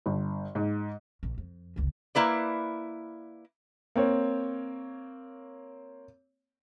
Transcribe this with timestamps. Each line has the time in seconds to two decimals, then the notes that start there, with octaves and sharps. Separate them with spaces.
0.06 G1
0.55 G#2
1.23 A#1 E3
1.38 F2
1.76 F1 C#2
2.15 A#3 E4 B4 D5
3.96 A#3 C4 C#5